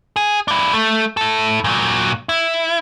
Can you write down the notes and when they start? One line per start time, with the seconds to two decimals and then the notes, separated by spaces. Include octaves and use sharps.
0.16 G#4
0.48 D4 E4
0.73 A3
1.17 E4 A4
1.64 A#2 F#3
2.29 E4